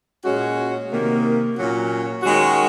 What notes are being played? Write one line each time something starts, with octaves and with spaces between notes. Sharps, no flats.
A#2 G#3 C#4 F#4
C3 D#3 A#3
A#2 F#3 C#4 F#4
D#3 G#3 C#4 F#4